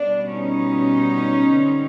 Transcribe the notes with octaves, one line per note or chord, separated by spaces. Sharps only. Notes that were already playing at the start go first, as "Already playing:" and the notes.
Already playing: B2 G3 B3 D4
C#4 D#4
D3 G3 C4